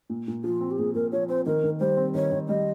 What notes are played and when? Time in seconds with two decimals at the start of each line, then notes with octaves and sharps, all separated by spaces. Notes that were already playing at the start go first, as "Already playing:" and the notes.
0.10 A#2
0.28 A#2
0.44 F3 F4
0.61 C4
0.71 G4
0.79 A#2 G#4
0.95 A#2 A#4
1.12 F3 C#5
1.29 C4 C5
1.46 D#3 A#4
1.64 D#3
1.80 G3 C5
1.97 C4
2.15 D#3 C#5
2.32 D#3
2.48 G3 D#5